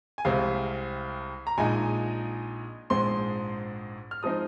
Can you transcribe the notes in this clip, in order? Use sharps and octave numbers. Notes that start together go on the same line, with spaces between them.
G#5
C2 C3 G#3 C4 F5
A#5
A#1 A#2 G#3 D#4 G#5
A#1 G#2 G#3 C4 C6
F6
F3 G#3 C4 D#4 D#6